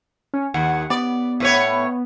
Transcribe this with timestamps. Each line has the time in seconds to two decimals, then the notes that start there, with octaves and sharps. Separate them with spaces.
0.34 C#4
0.54 D#2 F#5
0.90 B3 D5
1.40 A2 B4 C#5